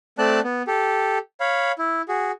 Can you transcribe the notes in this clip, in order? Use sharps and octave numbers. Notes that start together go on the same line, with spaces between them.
A3 C4 D5 A5 F#6
B3
G4 A4
C#5 F5 B5
E4
F#4 G#4